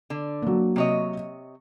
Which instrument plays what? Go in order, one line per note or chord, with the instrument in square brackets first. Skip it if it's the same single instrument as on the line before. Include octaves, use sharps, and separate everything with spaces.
[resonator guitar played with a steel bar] D3
[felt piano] F#3 A#3
[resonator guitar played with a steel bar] C3 C#5 D#5